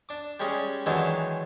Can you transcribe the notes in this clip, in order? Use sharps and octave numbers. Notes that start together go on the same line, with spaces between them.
D4 D6
G3 G#3 C#4 G#4
D#3 E3 F#3 G#3 D4 D#4